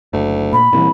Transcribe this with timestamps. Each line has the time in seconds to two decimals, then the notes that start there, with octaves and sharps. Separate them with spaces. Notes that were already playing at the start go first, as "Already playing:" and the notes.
0.13 F#1 D2
0.52 A#2 B5
0.72 C2 A#2 D3 E3